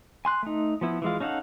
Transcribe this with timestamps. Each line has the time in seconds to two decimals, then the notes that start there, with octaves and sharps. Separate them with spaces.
0.25 G#5 C6 F#6
0.43 A3 D#4
0.81 F3 B3 E4
1.02 E3 G#3 F4
1.20 C#4 D#4 A4 F5 F#5